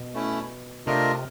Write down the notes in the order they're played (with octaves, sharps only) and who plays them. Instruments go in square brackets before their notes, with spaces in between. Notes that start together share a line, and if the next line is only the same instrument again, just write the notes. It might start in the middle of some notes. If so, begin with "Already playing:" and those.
Already playing: [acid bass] B2
[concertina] A3 C#4 E4
[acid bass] C3 [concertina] A3 D4 F4 A#4 D#5